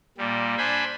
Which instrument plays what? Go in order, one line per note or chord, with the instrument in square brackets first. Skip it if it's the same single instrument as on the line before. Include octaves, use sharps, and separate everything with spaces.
[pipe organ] A#2 G3
D4 C5 G#5 B5